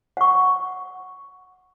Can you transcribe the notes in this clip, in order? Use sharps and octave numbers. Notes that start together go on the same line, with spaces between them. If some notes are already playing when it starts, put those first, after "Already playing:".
F#5 C#6